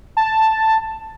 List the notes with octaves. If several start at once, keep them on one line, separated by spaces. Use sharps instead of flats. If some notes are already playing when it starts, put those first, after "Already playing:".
A5